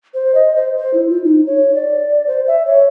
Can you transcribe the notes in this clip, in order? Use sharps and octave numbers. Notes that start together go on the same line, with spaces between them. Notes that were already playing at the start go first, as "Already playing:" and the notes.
C5
D#5
C5
C5
E4
F4
D#4
C#5
D5
C5
E5
C#5